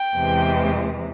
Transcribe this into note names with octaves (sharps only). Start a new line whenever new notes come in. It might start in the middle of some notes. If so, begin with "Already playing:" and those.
Already playing: G5
E2 C3 E3 G#3